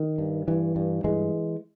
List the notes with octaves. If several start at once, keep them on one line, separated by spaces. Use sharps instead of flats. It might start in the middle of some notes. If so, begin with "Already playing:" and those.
Already playing: D#3
G2
G2 E3
G2
G2 E3 G#3